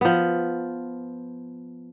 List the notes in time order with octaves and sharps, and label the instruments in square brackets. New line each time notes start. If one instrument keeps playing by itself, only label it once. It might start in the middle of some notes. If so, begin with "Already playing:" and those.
[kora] F3 B3